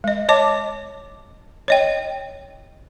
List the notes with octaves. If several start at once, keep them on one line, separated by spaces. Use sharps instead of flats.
G#3 D#5
C#5 D#5 A5 D6
C#5 D#5 G5